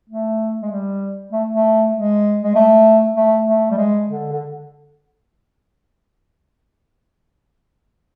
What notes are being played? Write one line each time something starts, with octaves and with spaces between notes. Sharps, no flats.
A3
G#3
G3
A3
A3
G#3
G#3
A3
A3
A3
G3
G#3
D3
D3